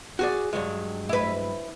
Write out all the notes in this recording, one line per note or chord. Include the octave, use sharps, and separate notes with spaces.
F#4 G#4 D5
G2 F#3 G#3
E4 B4